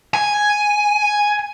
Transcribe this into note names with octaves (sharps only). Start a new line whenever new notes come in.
G#5